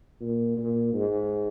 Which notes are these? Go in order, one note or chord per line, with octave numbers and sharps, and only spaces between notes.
A#2
A#2
G#2